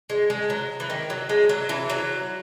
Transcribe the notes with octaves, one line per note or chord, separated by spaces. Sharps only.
G#3
G#3
F#3
E3
D#3
F#3
G#3
F#3
E3
F#3